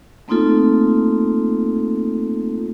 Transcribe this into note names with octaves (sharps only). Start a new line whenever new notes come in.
A3 A#3 C4 D#4 F4 A4